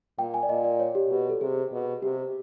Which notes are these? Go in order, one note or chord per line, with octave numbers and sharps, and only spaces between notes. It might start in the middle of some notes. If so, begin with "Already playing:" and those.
A#2 G5
G#5
D5
A#2 D#5
D5
C#5
G4
B2 G4
A4
C3 G#4
B2
C3 G4